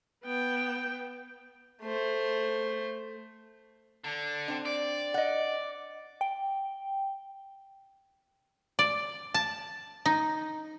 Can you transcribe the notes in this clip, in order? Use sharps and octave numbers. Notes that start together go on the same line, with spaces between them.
B3 G5
A3 C5
D3
C4 D4
D5
D#5 F#5
G5
D5
A5
D#4